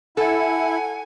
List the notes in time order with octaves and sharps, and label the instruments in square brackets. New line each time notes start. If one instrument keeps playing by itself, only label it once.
[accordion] E4 [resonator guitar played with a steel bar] A4 [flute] F#5 [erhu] G#5